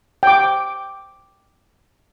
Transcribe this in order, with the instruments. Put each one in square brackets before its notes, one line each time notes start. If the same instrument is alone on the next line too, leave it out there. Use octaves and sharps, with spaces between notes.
[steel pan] G5 D6